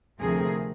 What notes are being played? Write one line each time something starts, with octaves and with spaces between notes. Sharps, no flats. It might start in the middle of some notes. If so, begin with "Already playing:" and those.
D2 C3 F3 A3 C4 G#4 A#4